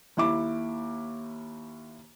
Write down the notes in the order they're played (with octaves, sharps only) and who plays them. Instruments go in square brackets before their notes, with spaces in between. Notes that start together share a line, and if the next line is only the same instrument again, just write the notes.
[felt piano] D#2 E4 D6